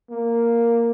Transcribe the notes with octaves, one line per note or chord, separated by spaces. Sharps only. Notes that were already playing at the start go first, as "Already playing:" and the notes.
A#3